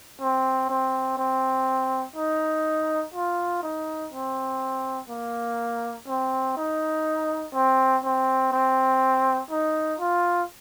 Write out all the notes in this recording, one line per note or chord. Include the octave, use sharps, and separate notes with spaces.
C4
C4
C4
D#4
F4
D#4
C4
A#3
C4
D#4
C4
C4
C4
D#4
F4